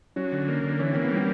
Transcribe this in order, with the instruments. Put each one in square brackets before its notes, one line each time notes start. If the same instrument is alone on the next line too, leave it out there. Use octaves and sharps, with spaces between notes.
[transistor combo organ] F#3 [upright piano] C#4
[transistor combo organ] D3
A#3
D3
[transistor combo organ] E3 [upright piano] C#4
[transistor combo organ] A#3 [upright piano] C4
[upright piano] B3
[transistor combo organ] G3 [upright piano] C4